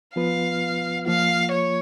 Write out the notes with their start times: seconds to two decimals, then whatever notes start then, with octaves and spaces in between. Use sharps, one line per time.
0.16 F3 B3 F4 B4 F5
1.06 F3 A#3 F4 F5
1.51 C#5